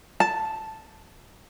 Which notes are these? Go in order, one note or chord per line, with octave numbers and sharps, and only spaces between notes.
A5